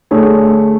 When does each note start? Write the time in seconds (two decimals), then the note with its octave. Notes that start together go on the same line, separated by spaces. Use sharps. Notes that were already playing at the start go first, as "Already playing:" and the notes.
0.11 D3 A3 D4 G#4 C#5